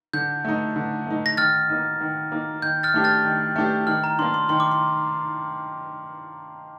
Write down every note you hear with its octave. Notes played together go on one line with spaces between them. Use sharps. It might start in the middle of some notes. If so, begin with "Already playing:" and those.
D3 G6
A3 D#4
D3
A3 D#4
A#6
D#3 F6 A6
A#3 D#4
D#3
A#3 D#4
D#3 G6
F6 A6
A3 D4 G4
F6 A6
D#3
A3 D4 G4
D#3 F6
A#5
A#3 D4 C6
C6
D#3 C6
D6
C6